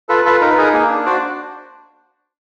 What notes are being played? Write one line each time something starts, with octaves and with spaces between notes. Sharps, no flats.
F4 A4 B4
F4 A4 B4
D#4 A#4
B4
D#4 G#4 A#4
A#3 G#4
D4
F#4 C5 D5